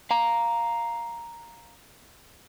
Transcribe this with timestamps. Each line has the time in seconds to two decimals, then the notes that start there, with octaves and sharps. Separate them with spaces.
0.11 F5 A#5